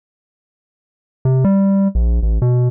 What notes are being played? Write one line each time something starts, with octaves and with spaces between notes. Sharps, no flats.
C3
G3
A#1
A1
B2